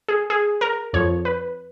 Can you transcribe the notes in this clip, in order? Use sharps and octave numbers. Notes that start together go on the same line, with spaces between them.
G#4
G#4
A#4
F2 F3 C#5
B4